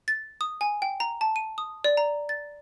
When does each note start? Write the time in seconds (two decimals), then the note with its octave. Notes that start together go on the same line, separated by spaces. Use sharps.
0.08 A6
0.41 D#6
0.61 G#5
0.82 G5
1.00 A#5
1.21 A5
1.36 D#7
1.58 D#6
1.84 D5
1.97 A#5
2.29 A6